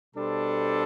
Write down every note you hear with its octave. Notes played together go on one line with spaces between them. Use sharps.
B2 G3 D4 A4 C5